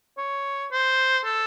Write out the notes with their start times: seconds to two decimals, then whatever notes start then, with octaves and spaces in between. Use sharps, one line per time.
0.18 C#5
0.71 C5
1.25 A4